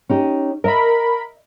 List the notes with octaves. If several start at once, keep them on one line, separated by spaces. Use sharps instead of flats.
C#4 D#4 G4
A#4 D#5 E5 B5